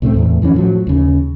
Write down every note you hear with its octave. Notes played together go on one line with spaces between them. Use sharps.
C2 A2 A3 C4
E2 A2
F2 E3 G3 C#4
A2 F3 F#3
D#2 C#3